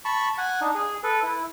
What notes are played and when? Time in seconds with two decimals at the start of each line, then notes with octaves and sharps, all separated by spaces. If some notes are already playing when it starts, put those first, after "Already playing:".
0.05 A5 B5 C#6
0.38 F#5 G#5
0.61 D4 D#4
0.75 G#4
1.03 A4 B4
1.23 E4